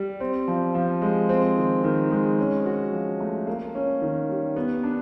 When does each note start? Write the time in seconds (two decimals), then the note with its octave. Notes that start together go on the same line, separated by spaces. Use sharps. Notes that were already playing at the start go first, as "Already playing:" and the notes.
Already playing: G3
0.20 C4
0.48 F3
0.75 F3
1.02 G#3
1.29 C4
1.57 D#3
1.84 D#3
2.11 G#3
2.39 C#4
2.66 F#4
2.93 F3
3.20 A3
3.47 A#3
3.75 C#4
4.02 D#3
4.29 G3
4.56 B3
4.83 D4